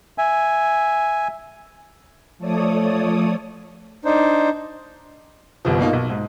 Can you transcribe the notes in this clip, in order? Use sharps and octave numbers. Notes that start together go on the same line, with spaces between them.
E5 G#5
F3 A3 A4 C#5 D5 D#6
D4 D#4 C5
G1 C2 F3
B2 A#3 D#4 F4
B1
G#2